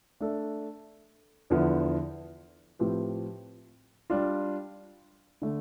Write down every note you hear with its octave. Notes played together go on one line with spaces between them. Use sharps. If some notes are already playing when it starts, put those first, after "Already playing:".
A3 D4 A4 E5
E2 D3 F3 B3 E4
A2 F3 C4 G4 B4
G3 D4 F4
D3 A3